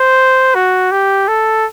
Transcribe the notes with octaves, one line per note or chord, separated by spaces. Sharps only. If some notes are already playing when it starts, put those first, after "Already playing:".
Already playing: C5
F#4
G4
A4